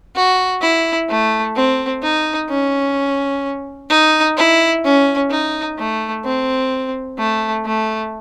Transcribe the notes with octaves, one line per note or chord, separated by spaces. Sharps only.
F#4
E4
A3
C4
D#4
C#4
D#4
E4
C#4
D#4
A3
C4
A3
A3